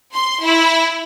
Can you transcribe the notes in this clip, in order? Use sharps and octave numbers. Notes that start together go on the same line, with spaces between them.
C6
E4